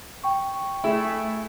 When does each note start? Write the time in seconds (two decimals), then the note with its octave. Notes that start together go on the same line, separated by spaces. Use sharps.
0.24 G5 C#6
0.84 A3 E4 G#4 E5